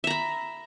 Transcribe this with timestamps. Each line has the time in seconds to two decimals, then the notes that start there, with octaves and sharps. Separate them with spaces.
0.04 E5
0.07 A#5
0.10 B5